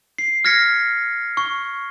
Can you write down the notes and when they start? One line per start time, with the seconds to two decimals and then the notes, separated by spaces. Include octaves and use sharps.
0.18 C7
0.45 F6 G#6 A#6 B6 C#7
1.37 C#6